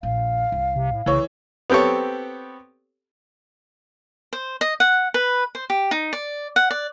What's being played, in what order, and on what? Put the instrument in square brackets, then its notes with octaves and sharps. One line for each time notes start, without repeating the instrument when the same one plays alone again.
[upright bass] A#1 [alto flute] F5
[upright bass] C2
[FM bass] C3
A2
[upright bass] C2 [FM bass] C#3 [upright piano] E3 C#5
[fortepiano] B3 C4 G4 A4 C#5
[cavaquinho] C5
D#5
F#5
B4
C5
G4
D#4
D5
F#5
D5